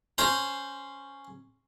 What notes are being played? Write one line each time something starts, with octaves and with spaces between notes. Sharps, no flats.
C#4 C5 A#5